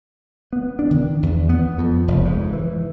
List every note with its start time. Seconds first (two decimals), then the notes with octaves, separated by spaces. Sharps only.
0.53 B3
0.79 D4
0.91 D#3
1.23 E2
1.49 B3
1.78 F2
2.08 F1
2.25 G#2
2.53 E3